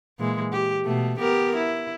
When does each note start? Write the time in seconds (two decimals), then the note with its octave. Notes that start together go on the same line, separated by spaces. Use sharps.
0.19 A#2 E3 G#3
0.53 G4
0.85 B2 A3
1.19 B3 G4 A#4
1.56 E4